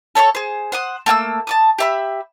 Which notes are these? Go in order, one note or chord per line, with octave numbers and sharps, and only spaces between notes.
A4 C#5 E5 C#6
G#4 C5
C5 F#5 D#6
A3 A#3 G#5 E6
A5 D6 D#6
G4 E5 B5